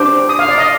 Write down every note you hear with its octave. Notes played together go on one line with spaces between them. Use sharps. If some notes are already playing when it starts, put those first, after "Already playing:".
Already playing: D4 G4 C5
D#6
F5
D5
D#5